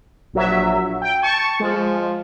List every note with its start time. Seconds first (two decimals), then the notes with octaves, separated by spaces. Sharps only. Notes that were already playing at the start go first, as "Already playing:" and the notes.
0.33 A#1 F#3 E5
1.02 G5
1.23 A5 C#6
1.60 F3 G#3